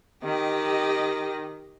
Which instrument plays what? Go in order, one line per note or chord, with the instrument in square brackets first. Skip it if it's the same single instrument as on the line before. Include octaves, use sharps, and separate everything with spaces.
[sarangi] D#3 [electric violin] G4 D#5